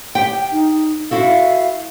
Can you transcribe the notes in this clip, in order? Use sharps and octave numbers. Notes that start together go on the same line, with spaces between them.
G4 G5
D#4
E4 F#4 A4 F5